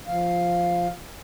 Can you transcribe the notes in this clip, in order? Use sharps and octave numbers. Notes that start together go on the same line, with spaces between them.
F3 F5